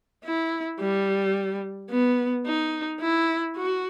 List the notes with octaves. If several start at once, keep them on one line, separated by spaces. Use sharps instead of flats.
E4
G3
B3
D#4
E4
F#4